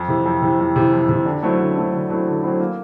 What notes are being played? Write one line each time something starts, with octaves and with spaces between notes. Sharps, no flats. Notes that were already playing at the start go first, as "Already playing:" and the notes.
Already playing: F2
C3 E3
F2
C3 E3
F2
C3 E3
F2
C3 E3
D3
F#3 A3 C4 E4
D3
F#3 A3 C4 E4
D3
F#3 A3 C4 E4
D3
F#3 A3 C4 E4
A#3